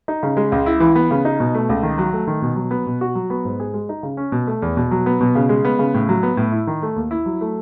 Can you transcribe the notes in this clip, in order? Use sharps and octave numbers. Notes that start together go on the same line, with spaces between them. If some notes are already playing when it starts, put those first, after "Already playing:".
D#4
C#3
G#3
C#2
E4
E3
B3
C#3
D#4
B2
A3
C#2
D#3
F#3
A3
D#3
B2
F#3
B3
B2
F#4
F#3
B3
G#2
G#4
G#3
D#4
C#3
C#4
B2
A3
E2
B2
F#3
B3
B2
C#3
G#3
B3
C#3
A2
F#3
B3
A2
E4
D#3
A3
D#2
E4
F#3
A3